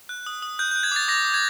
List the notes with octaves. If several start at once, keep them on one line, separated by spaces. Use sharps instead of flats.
F#6
D#6
D#6
F#6 G6
G6
F#6
G#6
D6 A6
D6 A#6
D6
G#6